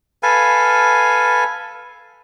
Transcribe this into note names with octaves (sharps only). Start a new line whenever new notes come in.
A4 B4 F5 G#5